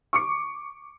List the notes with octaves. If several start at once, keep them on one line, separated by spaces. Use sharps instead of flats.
C#6 D6 C#7